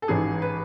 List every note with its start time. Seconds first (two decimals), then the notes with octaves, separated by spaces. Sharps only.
0.02 A4
0.08 A1 G#2 E3 G#4
0.42 B4